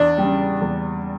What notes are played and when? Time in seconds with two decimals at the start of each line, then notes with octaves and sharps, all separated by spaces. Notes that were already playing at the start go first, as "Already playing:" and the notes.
Already playing: E2 D4
0.18 C#3 G3
0.61 E2